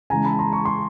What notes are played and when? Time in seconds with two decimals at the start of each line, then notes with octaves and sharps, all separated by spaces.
0.10 C#3 E3 G#3 G#5 A#5
0.24 A5 B5
0.39 A#5 C6
0.53 C#6
0.65 C6